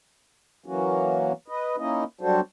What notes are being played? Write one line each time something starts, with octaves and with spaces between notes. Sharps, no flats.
E3 F#3 A#3 C#4 F#4
B4 D#5
A#3 C#4 D#4 E4 D#5
F#3 G3 D4 F#4 A4 C5